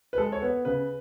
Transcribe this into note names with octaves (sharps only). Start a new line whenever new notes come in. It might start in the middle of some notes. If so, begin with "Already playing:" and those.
B4
G#3 A4
C#5
B3 B4
C#3 B4